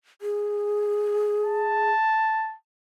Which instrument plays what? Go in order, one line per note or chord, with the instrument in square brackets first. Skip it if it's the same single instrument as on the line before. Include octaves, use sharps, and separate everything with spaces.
[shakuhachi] G#4
[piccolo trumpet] A5